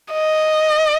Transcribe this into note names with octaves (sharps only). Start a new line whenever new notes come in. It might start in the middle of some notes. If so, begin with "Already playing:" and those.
D#5